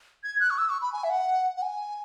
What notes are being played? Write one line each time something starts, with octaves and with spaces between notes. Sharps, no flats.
G#6
F#6
C#6
E6
C#6
B5
G#5
E5
F#5
F#5
G#5